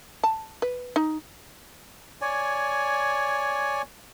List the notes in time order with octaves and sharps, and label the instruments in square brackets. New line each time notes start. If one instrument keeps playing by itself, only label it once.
[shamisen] A5
B4
D#4
[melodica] C#5 D5 G#5